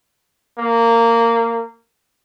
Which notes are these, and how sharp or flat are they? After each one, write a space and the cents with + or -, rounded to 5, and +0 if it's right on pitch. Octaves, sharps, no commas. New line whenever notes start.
A#3 -15